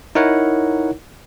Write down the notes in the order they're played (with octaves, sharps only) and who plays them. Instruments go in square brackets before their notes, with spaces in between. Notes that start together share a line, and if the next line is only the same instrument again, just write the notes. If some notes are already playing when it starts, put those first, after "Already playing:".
[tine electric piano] D#4 E4 A#4 C#5 F#5